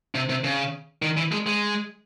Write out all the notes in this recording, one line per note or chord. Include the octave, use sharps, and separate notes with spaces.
C3
C3
C#3
D#3
E3
G#3
G#3